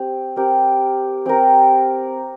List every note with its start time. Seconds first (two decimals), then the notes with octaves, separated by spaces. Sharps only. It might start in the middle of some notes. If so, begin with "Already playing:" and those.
Already playing: C4 G4
0.36 C4 G4 A#4
1.26 C4 G4 A#4